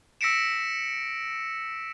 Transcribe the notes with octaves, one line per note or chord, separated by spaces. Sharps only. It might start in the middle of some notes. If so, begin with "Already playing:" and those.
E6 A#6 B6 C#7 D7 E7